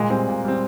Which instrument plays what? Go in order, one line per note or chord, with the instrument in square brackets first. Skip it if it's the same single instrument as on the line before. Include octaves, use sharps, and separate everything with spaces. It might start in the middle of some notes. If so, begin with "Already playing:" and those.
Already playing: [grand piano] A#2 [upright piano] G#3
[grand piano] G3 C4
A#2
G3 C4